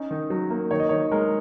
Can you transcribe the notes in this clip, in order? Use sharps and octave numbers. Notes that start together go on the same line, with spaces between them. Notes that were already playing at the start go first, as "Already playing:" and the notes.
Already playing: C#4 D#4
D#3
F#3
A#3
D#3 C#5
D#5
D#3 C#5
G#3 A#4